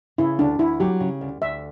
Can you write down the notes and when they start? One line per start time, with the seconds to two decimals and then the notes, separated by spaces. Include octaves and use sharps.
0.18 C#3 E4
0.39 D2 D4
0.59 D2 E4
0.80 F#3 G4
1.00 C#3
1.21 D2
1.42 D2 E5